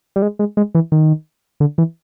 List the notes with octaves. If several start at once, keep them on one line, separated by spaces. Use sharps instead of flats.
G3
G#3
G#3
G#3
E3
D#3
D3
E3